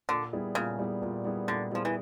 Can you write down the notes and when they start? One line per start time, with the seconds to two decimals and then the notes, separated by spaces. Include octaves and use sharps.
0.09 A#2 D3
0.33 G3 B3 E4 G#4
0.55 A#2 C#3
0.79 G3 B3 E4 G#4
1.02 A#2
1.25 G3 B3 E4 G#4
1.48 A#2 D3
1.72 F3 G3 B3 E4 G#4
1.85 E3